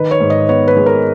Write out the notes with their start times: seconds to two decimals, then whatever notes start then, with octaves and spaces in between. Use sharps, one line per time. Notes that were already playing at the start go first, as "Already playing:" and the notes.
Already playing: D#3 B4
0.11 C#5
0.21 G#2
0.30 D#5
0.49 B3 C#5
0.68 B4
0.77 G#3
0.86 A#4